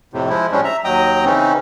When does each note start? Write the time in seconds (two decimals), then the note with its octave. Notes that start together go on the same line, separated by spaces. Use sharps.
0.13 F2 A2 C3
0.29 F3 G#3 E4
0.52 A2 F3 G3 G#3 C#4 D4
0.64 E5 A#5
0.84 D#2 F#3 D#5 G5 A#5 D#6
1.25 C#3 E3 C4 C#4 D#4